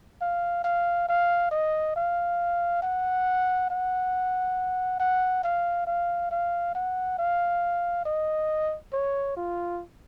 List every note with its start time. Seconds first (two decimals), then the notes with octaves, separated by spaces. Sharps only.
0.22 F5
0.64 F5
1.09 F5
1.51 D#5
1.96 F5
2.82 F#5
3.70 F#5
5.00 F#5
5.44 F5
5.87 F5
6.31 F5
6.75 F#5
7.19 F5
8.05 D#5
8.93 C#5
9.37 F4